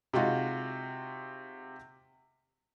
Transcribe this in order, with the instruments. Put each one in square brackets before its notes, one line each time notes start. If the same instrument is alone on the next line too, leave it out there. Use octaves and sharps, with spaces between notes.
[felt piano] C3 G#3 D#4 F4 F#4